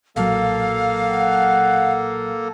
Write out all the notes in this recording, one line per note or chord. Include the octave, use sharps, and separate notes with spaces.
B1 A#2 F#3 A#3 A4 F5
F#5